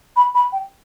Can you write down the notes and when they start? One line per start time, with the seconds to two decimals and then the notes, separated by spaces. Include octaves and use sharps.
0.16 B5
0.35 B5
0.52 G5